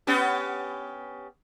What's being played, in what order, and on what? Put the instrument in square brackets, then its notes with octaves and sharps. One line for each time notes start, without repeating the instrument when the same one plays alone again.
[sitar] B3 C#4 G4